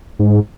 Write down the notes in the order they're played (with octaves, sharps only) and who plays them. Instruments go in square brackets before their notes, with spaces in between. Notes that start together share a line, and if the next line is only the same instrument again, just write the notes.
[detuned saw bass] G#2